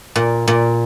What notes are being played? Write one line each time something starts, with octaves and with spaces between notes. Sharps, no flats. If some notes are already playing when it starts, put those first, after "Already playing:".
A#2
A#2